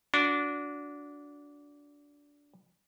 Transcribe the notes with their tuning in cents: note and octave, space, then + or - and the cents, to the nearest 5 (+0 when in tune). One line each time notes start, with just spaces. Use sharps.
D4 -20 F#4 -15